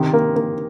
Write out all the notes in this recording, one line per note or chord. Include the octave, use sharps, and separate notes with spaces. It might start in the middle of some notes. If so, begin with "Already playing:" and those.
Already playing: C3 D#3
A#3
A#3